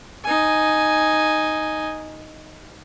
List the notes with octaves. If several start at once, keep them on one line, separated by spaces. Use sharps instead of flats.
D#4 G#5